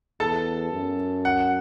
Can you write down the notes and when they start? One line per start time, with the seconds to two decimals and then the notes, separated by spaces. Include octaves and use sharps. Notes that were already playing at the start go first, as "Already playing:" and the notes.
0.20 E2 A4 A5
0.72 F#2
1.25 F#5